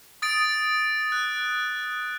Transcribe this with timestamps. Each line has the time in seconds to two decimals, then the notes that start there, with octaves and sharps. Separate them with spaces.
0.22 D#6 A6 D7
1.12 F#6